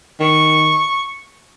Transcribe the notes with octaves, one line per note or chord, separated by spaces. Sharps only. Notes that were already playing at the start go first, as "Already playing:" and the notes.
D#3 C#6